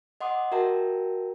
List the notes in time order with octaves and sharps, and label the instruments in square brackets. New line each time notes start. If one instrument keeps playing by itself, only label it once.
[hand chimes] D#5 F#5 C6 D6 D#6
F#4 A#4 E5 G5 A5 A#5